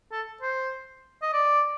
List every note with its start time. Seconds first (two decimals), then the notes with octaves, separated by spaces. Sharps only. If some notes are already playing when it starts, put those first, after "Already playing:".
0.12 A4
0.42 C5
1.22 D#5
1.33 D5